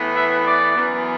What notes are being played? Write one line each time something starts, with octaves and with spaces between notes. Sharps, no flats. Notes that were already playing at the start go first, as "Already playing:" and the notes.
Already playing: A2 E3 B3
E5
D5
F#2 E3 B3